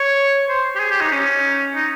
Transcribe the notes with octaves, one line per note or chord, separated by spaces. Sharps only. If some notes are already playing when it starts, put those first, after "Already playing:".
Already playing: C#5
C5
G4
G#4
G4
D#4
C#4
D#4